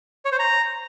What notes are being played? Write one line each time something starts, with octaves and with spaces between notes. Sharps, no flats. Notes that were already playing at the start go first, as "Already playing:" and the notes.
C#5
C5
A#5